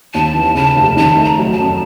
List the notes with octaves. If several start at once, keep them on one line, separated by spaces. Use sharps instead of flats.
D#2 A5
E3
C#3 A5
F1
D#3 A5
A3
A#5
F#3
A5
F#2